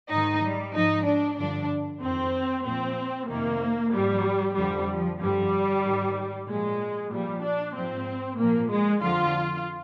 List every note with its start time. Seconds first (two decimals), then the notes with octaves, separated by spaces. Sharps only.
0.10 G#2 D#3 D#4
0.42 G3
0.74 G#2 F3 D#4
1.06 D4
1.38 G2 D3 F3 D4
2.02 F2 D#3 C4
2.65 A#2 F3 C4
3.29 F2 C3 D#3 A#3
3.93 G#2 F3 G3
4.56 F2 D3 F3 G3
4.89 F3
5.20 G2 D3 F3 G3
5.83 G#2 D#3
6.47 A#2 F3 G#3
7.11 A#2 F3 G3
7.43 D4
7.75 G#2 F3 C4
8.38 A#2 F3 A#3
8.70 G#3
9.02 F2 D3 F3 F4